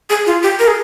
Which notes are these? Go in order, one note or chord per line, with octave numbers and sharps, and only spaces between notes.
G#4
F4
G4
A#4
G#4